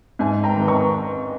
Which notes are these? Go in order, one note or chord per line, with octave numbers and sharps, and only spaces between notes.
G#2 E5 G#5
G5 A#5
D#3 G#3 B3
A#5 C#6